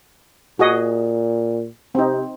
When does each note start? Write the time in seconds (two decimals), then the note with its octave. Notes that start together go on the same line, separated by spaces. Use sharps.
0.59 A#2 F#4 G#4 D#5
1.95 C3 C4 D#4